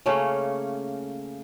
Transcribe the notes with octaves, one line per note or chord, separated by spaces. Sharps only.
C#3 A3 A#3 C#4